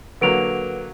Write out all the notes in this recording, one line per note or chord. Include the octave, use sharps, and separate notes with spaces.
D3 F#3 A#3 B4 D7 F7